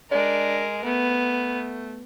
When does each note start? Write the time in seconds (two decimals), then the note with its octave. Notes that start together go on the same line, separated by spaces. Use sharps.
0.12 G#3 D4 A#4
0.85 A3 B3